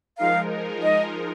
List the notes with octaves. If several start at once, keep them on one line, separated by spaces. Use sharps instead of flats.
F3 G#3 D#4 A#4 F5
D#5